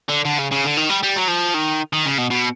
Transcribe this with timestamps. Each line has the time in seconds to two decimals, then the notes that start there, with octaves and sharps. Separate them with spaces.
0.09 D3
0.25 D3
0.39 C#3
0.52 C#3
0.65 D3
0.77 D#3
0.90 G3
1.03 G3
1.16 F#3
1.28 F3
1.54 D#3
1.93 D#3
2.06 C#3
2.18 B2
2.30 B2